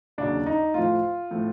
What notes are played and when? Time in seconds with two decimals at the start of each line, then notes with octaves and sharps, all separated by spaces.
0.18 D#2 C#3 F#3 D4
0.46 D#4
0.74 A2 F3 F4
1.31 A2 F3